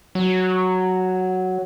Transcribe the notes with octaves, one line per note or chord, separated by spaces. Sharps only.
F#3